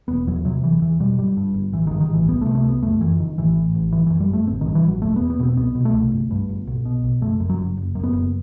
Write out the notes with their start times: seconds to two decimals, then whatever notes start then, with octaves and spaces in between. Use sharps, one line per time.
0.08 E1 B3
0.27 E2 F#3
0.45 C3 F#3
0.63 E1 E3
0.81 E2 E3
1.00 B2 G3
1.18 G1 G3
1.37 G2
1.54 G1
1.73 A1 E3
1.87 G2 D#3
2.00 D#3
2.10 A1 E3
2.28 C2 B3
2.41 A3
2.46 C3
2.55 A3
2.64 C2 B3
2.82 F#1 A3
3.01 F#2 E3
3.19 F#1 D#3
3.38 A1 E3
3.55 A2
3.75 A1
3.92 G1 E3
4.06 F#2 E3
4.20 G3
4.30 G1 A3
4.47 A1 C4
4.61 G2 D#3
4.75 E3
4.83 A1 F#3
5.02 E1 A3
5.16 B3
5.21 E2
5.30 B3
5.39 B2 C4
5.57 C2 B3
5.75 B2
5.85 A3
5.93 C2
6.12 G1
6.31 G2
6.49 G1
6.67 B1
6.85 B2
7.04 B1
7.21 F#1 A3
7.40 F#2
7.50 F#3
7.58 F#1
7.77 F#1
7.95 F#2
8.04 B3
8.13 F#1